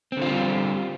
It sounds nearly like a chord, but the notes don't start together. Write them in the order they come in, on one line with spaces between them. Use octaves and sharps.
C4 D3 F4 G3